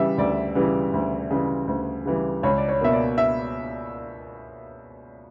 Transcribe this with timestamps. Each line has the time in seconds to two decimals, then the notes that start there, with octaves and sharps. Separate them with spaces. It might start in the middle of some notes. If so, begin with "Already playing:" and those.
Already playing: C#3 E3 G3 E5
0.18 D2 D5
0.55 C#3 E3 G3
0.94 D2
1.31 C#3 E3 G3
1.67 D2
2.06 C#3 E3 G3
2.43 C#2 C#5
2.58 D5
2.69 C#5
2.81 B2 A#3 E5
2.93 D5
3.18 E5